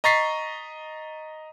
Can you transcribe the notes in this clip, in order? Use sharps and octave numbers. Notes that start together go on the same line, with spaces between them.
D#5 A#5 C#6 A6 B6 C7